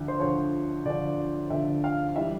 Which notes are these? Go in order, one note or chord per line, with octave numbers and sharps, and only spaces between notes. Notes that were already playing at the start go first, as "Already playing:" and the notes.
Already playing: D2 D3 F3
C5
D2 D3 F3 C#5
D2 D3 F3 D5
D2 D3 F3 E5
F5
E3 G3 E5